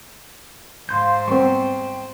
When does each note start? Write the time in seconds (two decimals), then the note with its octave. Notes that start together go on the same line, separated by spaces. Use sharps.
0.89 G#2 C5 F5 C6 G6
1.28 G3 B3 C4 G5 C#6